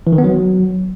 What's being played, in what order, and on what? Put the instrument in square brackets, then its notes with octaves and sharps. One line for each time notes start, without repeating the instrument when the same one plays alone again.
[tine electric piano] E3
D#3
B3
F#3